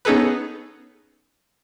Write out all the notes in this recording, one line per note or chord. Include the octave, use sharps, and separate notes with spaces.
B3 C#4 D#4 G#4 A4 B4